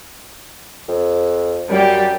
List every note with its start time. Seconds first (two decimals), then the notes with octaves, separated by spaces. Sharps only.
0.88 F2
1.69 F#2 G3 G4